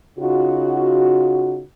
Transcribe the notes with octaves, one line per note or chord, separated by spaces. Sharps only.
C#3 D#4 F4 F#4